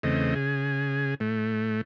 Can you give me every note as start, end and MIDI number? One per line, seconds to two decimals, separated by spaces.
0.03 0.35 40
0.03 0.35 49
0.03 0.35 57
0.03 0.35 60
0.03 0.35 75
0.35 1.14 49
0.35 1.14 68
1.20 1.81 45
1.20 1.81 57